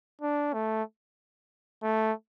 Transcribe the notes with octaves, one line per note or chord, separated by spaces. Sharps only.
D4
A3
A3